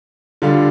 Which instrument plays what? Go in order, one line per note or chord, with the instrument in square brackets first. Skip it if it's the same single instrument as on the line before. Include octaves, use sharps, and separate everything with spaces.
[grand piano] D3 G3 D4 F4